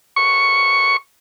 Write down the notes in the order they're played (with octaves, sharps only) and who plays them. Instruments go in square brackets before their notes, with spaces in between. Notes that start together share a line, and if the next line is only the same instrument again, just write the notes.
[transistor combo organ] C#6